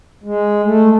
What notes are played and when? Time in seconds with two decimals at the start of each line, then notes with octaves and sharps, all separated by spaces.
0.24 G#3
0.64 A3